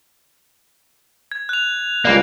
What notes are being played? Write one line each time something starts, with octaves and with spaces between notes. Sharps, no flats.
G#6
F#6 F7
C#2 G3 A#3 D5